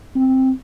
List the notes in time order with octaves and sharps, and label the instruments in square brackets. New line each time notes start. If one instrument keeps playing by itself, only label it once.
[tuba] C4